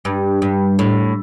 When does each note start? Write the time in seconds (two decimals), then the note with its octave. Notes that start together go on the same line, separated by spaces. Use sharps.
0.05 G2
0.42 G2
0.79 A2